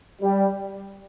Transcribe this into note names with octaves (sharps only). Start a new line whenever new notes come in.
G3